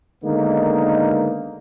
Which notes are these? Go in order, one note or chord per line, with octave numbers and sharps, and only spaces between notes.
D3 D#3 G#3 A#3 B3 D#4